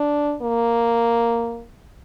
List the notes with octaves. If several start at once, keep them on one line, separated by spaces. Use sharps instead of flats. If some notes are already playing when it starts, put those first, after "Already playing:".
Already playing: D4
A#3